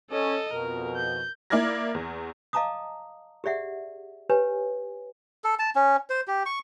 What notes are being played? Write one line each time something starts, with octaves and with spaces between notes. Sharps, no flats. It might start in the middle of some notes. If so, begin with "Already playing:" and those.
C#4 A4 D#5
F2 B2 A#4
G6
A#3 E4 D5 F6 G#6 A#6
E2
D#5 F5 A5 A#5 D6 D#6
G4 G#4 D5 E5 F#5
G4 B4 C#5 G#5
A4
A5
C#4
C5
G4
C#6